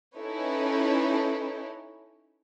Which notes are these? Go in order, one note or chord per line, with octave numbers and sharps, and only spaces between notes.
C#4 D#4 E4 A4 B4 C#5